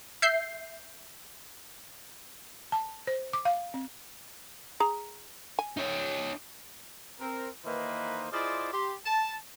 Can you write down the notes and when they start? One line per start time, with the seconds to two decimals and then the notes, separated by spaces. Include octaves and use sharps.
0.22 E5 G6 C7
2.72 A5
3.07 C5
3.33 D6
3.45 F5
3.74 C4
4.80 G#4 A#5
5.59 G#5
5.77 D#4 C#5
7.20 C4 A#4
7.64 D#3 E3 A#3 D#4 B4 C5
8.31 E4 F4 G#4 C5 D5 D#5
8.72 G4 C6
9.05 A5